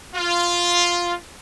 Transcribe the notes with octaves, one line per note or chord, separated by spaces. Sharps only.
F4